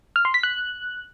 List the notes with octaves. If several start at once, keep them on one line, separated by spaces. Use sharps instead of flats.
F6
C6
B6
F#6